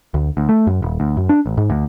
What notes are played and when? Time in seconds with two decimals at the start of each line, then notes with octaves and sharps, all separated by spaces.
0.14 D2
0.37 D2
0.49 A3
0.67 F#2
0.82 D#1
1.00 D2
1.17 F#2
1.29 D4
1.46 A1
1.57 G#2
1.70 D2